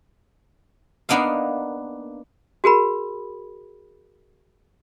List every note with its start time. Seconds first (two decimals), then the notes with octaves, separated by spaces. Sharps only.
1.09 A#3 B3 D4 D#4 F5
2.64 F#4 G#4 A#4 B5